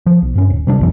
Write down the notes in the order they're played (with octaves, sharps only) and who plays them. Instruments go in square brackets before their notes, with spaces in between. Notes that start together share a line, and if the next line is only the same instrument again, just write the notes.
[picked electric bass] F3
B1
G2 C#4
D#1
C3 G3 D4
A#1 F2 E3